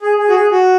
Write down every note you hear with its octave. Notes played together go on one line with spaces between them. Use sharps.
G#4
G#4
F#4
G#4
F#4